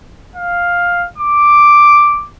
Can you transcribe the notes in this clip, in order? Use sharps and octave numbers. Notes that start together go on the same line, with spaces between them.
F5
D6